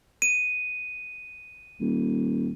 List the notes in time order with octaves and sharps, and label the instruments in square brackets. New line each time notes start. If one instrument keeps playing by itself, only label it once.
[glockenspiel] D#7
[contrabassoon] D#1